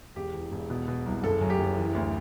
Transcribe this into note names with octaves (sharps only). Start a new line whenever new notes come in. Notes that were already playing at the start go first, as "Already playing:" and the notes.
E1 G4
E2
E1
B2
B2
C2
F#1 A4
F#2
G4
F#1
E3
D2